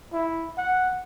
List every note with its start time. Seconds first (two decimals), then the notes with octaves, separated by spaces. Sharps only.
0.13 E4
0.58 F#5